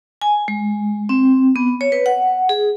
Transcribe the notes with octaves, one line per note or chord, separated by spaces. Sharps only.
G#5
G#3
C4
B3
C#5
B4
F#5
G#4